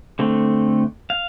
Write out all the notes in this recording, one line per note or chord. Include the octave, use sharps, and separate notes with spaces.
D3 A3 C4
F5